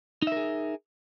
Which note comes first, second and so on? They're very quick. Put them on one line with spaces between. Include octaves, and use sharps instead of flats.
D#4 E5 A#4 G#4